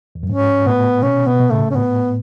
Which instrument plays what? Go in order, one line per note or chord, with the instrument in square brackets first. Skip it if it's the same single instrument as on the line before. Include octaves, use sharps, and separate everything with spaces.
[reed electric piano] E2
F#2
[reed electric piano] G#2 [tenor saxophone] C#4
[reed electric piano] A2 [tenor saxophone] B3
[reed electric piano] B2 [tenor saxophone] C#4
[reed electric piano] B2 [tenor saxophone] B3
[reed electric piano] B2
[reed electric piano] A2 C#3 [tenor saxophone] A3
[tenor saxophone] C#4
[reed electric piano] A2 [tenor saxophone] B3